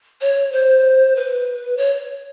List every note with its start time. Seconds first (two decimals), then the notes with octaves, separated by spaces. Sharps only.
0.21 C#5
0.52 C5
1.16 B4
1.77 C#5